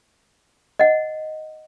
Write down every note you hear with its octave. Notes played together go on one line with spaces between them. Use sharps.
D#5 F#5